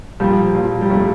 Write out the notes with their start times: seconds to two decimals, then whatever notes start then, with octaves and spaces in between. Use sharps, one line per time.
0.20 A#2 F3 G3
0.55 A#2 F3
0.81 G3
0.90 A#2 F3 A3